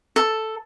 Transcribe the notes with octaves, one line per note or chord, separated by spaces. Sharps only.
A4